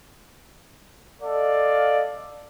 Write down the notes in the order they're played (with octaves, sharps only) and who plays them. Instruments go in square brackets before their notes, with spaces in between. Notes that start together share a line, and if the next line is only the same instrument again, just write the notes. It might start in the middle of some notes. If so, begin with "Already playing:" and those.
[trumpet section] A4 D5 D#5 F5